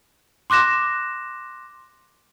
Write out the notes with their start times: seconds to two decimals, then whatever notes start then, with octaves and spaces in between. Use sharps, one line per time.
0.50 C6 D6 F#6 A#6 E7